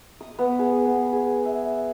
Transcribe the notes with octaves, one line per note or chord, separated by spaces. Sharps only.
D#6
B3
G#4
B3
G#4
E5